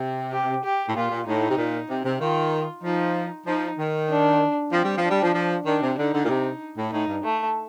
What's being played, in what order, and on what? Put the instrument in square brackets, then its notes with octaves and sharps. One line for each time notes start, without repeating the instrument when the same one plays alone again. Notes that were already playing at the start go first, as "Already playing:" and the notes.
Already playing: [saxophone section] C3
[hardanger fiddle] G4
G4
[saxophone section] A2
[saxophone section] A#2 [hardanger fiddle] F4
[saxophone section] A#2
[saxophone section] A2 [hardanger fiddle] D#4
[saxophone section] C3
A#2
C3
C3
[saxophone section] D#3 [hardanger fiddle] F4
[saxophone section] F3 [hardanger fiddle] D#4
[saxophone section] F3 [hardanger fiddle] D#4
[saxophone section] D#3
[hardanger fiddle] D4
[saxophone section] F3 [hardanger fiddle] C4
[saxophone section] G3
F3
[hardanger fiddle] D4
[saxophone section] G3
F3
F3
[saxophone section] D#3 [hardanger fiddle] D4
[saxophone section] C3
[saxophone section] D3 [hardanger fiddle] D#4
[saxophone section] D3
A#2
C3
A2
[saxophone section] A2 [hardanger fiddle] D#4
[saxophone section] G2
[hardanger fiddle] A3